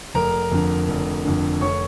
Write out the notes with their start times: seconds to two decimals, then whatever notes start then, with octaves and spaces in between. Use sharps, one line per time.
0.14 F1 A#4 A#5
0.52 F2 D3
0.88 F1
1.25 F2 D3
1.61 F1 C#5 C#6